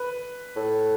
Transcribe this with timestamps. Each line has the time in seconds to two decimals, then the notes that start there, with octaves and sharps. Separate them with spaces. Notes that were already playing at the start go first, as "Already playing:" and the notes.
Already playing: B4
0.56 A2